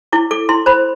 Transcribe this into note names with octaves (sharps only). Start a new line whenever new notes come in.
E4 D6
A4 D6
E4 C6
C5 B5